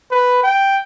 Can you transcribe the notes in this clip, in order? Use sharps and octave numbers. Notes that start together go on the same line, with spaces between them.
B4
G5